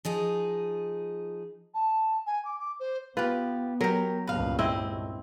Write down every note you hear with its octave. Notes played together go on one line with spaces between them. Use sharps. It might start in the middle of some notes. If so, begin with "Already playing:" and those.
F3 D#4 G#4
A5
G#5
D6
D6
C5
B3 F4 G4 B4
F#3 G4 A#4
C#2 G2 A#2 B4 F5
C4 E4 D#5